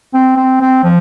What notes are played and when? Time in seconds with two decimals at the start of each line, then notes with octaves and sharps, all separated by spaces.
0.14 C4
0.37 C4
0.61 C4
0.84 F3